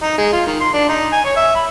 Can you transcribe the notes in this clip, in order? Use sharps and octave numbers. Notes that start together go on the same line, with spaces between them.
D#4
G#3
F4
D#3
C6
D4
D#4
G#5
C#5
E5
B5